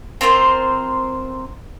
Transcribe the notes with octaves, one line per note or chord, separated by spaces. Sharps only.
C4 F4 A#4 C5